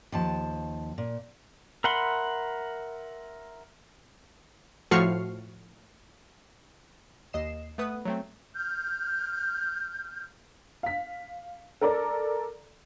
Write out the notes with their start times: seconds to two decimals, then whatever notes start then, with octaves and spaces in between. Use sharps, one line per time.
0.12 D#2 F3 A5
0.98 A#2
1.84 A#4 E5 F#5 B5 C6
4.91 A2 F3 F#4 C#6 F6 C7
7.33 D#2 D#5 C7 E7
7.78 A3 B3 B4 D#6
8.05 F#3 A3 C4
8.55 F6 G6
10.83 F5 B6
11.81 A4 A#4 D5